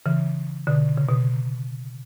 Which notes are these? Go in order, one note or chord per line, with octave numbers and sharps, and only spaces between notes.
C#3 E3
B2 D3
C#3
B2